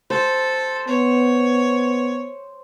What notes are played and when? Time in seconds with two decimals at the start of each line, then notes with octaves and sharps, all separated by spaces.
0.10 A4 C5
0.87 B3 C#5